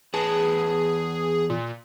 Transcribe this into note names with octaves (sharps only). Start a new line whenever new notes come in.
E2 G#4 B4 A5
A#2